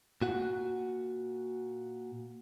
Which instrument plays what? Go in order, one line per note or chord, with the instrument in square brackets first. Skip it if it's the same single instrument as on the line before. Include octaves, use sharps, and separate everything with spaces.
[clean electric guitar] A#2 F#4 F#5